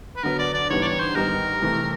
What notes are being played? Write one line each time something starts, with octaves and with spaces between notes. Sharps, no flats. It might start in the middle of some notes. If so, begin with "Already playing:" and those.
B4
D3 F#3 B3 A#4
D5
D5
G#2 E3 G3 B3 D4 C#5
D5
C#5
C5
G#2 D#3 G3 B3 D#4 A#4
C3 E3 A3